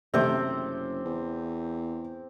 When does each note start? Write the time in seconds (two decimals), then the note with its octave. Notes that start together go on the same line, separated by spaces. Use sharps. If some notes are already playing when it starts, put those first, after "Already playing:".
0.14 F#1 C3 A3 C4 C5 D6
1.05 E2